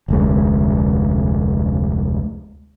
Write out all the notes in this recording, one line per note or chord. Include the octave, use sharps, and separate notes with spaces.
F1 D2 G#3